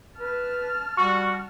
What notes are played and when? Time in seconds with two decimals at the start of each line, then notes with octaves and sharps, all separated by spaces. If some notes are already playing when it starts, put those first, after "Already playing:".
0.20 B4 A5 F6
0.97 G3 F#4 C#6